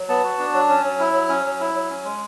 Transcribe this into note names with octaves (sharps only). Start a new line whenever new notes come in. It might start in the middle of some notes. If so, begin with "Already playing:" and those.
Already playing: F#3
B3 A5
F#4
D4
F#3
C#4
F#3
E4
F#3
C#4
F#3
E4
F#3
C#4
G#3